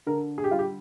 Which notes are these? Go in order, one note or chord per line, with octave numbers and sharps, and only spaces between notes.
D3 A#4
G#4
G4
G3 F4
G4